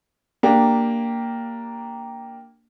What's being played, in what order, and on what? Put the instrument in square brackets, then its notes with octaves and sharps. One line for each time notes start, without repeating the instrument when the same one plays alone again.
[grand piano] A#3 D4 G4